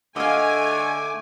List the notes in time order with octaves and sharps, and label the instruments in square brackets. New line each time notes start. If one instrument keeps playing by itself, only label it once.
[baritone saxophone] D3 [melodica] A3 D6 [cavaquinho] D#5 F5 [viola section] G#5